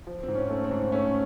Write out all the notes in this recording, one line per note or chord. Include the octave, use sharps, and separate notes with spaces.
F3
C4
G#2
C#4
A3
C4
G#2
A3 C#4